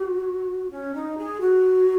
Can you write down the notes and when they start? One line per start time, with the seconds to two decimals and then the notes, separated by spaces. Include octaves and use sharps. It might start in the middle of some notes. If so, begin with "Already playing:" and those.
Already playing: F#4
0.71 C#4
0.94 D#4
1.17 G#4
1.41 F#4